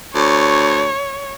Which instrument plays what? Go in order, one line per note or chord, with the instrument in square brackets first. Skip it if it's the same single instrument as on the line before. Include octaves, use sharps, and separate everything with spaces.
[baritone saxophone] D2 [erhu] C#5